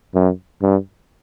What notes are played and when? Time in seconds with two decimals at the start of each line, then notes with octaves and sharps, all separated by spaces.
0.14 F#2
0.62 G2